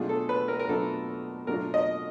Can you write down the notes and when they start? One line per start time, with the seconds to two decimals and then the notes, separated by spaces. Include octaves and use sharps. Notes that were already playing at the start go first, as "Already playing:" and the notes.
Already playing: B2 F#3 A3 D4 F4 G#4
0.09 A4
0.29 B4
0.48 A#4
0.60 A#4
0.68 B2 F#3 A3 D4 F4 A4
1.47 B2 F#3 A3 D4 F4 A#4
1.74 D#5